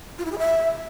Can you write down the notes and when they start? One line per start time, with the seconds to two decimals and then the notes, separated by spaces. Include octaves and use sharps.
0.18 F4
0.25 E4
0.32 G#4
0.38 E5